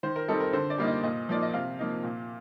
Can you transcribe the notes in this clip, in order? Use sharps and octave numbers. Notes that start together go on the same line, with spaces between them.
D#3 C5
A#4
G3 C4 D#4 A4
A#4
D3 C5
D5
G3 A#3 D#4
D#5
A#2 D#5
F3 A#3 D#4 D5
D#5
C3 F5
F3 A#3 D#4
A#2